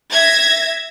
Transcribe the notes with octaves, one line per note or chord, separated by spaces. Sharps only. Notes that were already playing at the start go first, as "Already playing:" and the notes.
E5 G#6 A#6